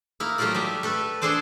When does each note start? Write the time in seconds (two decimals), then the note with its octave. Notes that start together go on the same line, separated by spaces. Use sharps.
0.20 A#3 D#4 E4
0.38 F#3 A3 D#4 F4 G4 D5
0.55 G3 D5 E5
0.83 A3 A4 B4
1.22 D4 G#4 A4 C5 D5